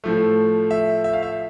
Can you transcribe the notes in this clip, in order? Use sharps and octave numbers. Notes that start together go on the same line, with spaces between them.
A2 F3 A3
E5
E5
F5
E5